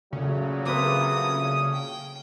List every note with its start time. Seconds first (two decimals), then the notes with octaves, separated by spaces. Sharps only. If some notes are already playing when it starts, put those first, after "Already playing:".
0.13 A#2 C#3 F#3 A3
0.66 A#3 C4 B4 D#6
1.73 G5